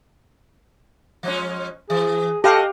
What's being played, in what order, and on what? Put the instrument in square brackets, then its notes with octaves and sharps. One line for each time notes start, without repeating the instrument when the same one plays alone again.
[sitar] F3 G#3 C#4
[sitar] E3 [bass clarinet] G#4
[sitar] F#4 D#5 [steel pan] G4 F5 [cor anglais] A4